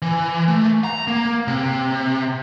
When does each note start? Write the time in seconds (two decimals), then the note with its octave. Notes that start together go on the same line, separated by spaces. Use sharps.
0.02 E3
0.48 A3
0.84 A#5
1.07 A#3
1.48 C3